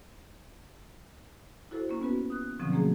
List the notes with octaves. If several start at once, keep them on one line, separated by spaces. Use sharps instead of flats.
E4 F#4 A4 C5
A#3 C#4 F4
B3 F#4 B4
D#6 F#6
B2 D3 F3 F#3 C4 C#4
F3 A3 A#3 F#4 G#4